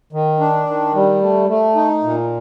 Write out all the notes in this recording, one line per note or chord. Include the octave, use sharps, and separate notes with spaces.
D#3
D4
D#3
G3
A3
A3
D#4
A#2